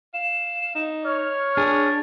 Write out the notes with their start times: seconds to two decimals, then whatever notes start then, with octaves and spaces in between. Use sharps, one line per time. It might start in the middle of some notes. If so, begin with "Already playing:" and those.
0.14 F5 E7
0.75 D#4
1.05 C#5 F6
1.57 D4 G#4